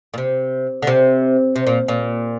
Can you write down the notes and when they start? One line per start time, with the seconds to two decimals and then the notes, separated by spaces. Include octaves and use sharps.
0.14 A#2
0.18 C3
0.82 D3
0.87 C3
1.56 C3
1.67 A#2
1.88 A#2